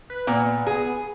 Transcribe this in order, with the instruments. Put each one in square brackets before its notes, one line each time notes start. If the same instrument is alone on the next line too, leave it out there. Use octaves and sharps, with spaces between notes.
[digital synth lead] B4
[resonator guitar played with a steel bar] A#2 [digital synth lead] B3
[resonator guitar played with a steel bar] G#4